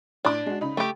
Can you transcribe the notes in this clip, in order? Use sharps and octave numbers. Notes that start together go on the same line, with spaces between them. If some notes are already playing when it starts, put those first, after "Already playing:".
A2 D4 D6
G#3 F#4
C#3 D#4 B5
A3 G4